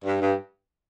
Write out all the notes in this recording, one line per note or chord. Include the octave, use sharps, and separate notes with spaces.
G2
G2